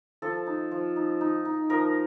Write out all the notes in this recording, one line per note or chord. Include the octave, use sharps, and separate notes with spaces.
F3 A4
D#4
F3
D#4
D#4
D#4
F3 A#4